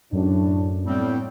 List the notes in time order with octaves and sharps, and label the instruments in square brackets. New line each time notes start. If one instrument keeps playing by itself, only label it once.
[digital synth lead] F#2 [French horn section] A2 D4
[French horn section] A2 [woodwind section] G3 B3 C4